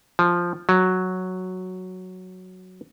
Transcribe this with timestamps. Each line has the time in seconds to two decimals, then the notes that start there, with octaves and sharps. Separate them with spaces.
0.19 F3
0.69 F#3